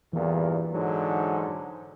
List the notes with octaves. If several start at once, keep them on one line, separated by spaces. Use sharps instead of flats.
E2 G2 A#2 E3
G#2 D3 F#3